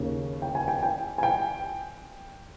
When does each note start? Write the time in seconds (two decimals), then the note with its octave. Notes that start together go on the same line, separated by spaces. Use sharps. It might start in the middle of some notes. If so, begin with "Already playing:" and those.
Already playing: D#2 C#3
0.42 G5
0.55 G#5
0.68 G5
0.83 G5
1.18 G#5
1.23 G5